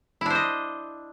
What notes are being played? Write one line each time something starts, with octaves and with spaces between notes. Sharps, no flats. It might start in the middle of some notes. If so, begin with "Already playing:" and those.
D4 E4 C5 D#5